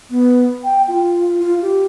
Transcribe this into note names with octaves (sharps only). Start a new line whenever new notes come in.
B3
G5
F4
F4
G4